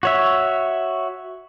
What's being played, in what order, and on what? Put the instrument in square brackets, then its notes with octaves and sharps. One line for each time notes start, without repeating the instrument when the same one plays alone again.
[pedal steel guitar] F#4 C#5 E5